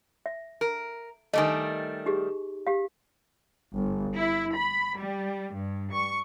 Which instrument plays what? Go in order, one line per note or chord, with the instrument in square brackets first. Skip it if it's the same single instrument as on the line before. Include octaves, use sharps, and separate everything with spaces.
[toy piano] E5
[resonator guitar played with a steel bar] A#4
[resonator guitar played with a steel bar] D#3 G3 A3 [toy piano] D#5 G#5
[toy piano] D#4 G4 G#4
G4 F5
[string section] G1
E4
B5
G3
G2
C#6